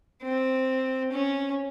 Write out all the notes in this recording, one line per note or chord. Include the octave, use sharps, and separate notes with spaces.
C4
C#4